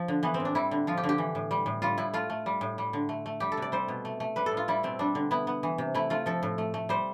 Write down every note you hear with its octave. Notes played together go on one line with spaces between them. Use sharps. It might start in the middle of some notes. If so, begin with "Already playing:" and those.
Already playing: F3
D3
E3 B3
C4
A2
D4
G3 E4
D3
F3 F4
G4
D3
G4
E3
A2
G3
A2
G3 F4
A2 E4
A3 F4
A3
G3
A2
G3
D3
A3
A3
G3 G4
A4
C3 D5
G3 C5
B2
A3
A3
G3 B4
A4
A2
F4
G3 E4
B2 C4
G3 D4
D3
B3 E4
B3
E3
C3
A3 E4
A3 F4
F3 A4
A2
A3
A3
G3 C5